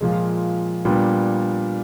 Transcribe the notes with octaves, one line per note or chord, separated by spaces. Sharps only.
A#2 F3 G#3
A#2 G3 B3 D4